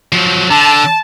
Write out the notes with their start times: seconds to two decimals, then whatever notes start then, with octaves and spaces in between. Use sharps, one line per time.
0.12 F3 F#3
0.50 D3 A5